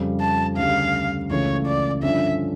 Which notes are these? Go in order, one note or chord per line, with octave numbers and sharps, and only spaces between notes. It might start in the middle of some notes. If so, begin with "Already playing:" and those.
Already playing: F2 C#3 G3
A5
D2 C#3 G3 F5
C#2 C#3 E3 A3 C#5
D5
G2 D3 F3 C#4 E5